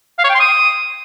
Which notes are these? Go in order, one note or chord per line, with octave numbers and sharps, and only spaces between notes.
F5
C#5
G5
C6
D#6